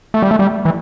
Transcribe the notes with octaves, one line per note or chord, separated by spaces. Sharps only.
A3
G3
A3
G3
E3